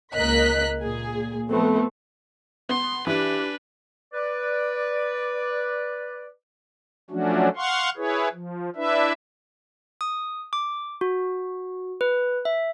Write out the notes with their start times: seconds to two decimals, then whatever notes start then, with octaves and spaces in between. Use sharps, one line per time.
0.15 C#2 A#3 A#4 D#5 F#6 B6
0.81 A#2 G#4
1.49 F3 A3 B3 C4
2.69 B3 C6
3.07 E3 D4 G4 B4
4.13 B4 D5
7.10 F3 F#3 A3 C#4 D4 F#4
7.56 F5 F#5 C6 C#6
7.97 E4 G#4 B4 C#5
8.33 F3
8.76 D4 E4 B4 E5
10.01 D#6
10.53 D6
11.01 F#4
12.01 B4
12.45 E5